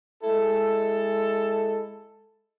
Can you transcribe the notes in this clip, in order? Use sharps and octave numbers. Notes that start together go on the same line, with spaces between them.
G#3 E4 A4